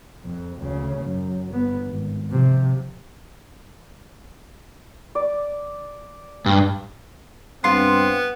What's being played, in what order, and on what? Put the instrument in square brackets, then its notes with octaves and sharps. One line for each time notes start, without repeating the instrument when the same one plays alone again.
[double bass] F2
D2 C#3
F#2
G1 B3
G#1
C3 F3
[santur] D5
[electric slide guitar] G2
[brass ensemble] G2 C4 [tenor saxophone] B3 [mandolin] F4 C6